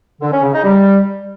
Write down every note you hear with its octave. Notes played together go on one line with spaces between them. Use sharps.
D3
C#4
C#3
D#4
G3